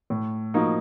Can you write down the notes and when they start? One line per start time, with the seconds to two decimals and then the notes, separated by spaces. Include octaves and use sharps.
0.10 A2
0.54 F3 A#3 D#4 F#4